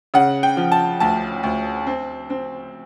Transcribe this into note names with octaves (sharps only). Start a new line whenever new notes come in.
C#3 F#5
G5
F3
A5
D2 A5
D2
C4
C4